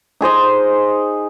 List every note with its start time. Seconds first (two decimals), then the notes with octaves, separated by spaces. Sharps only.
0.21 D#4 G#4 C5 D#5